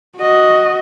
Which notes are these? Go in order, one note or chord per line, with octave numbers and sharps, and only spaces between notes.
F#4 D#5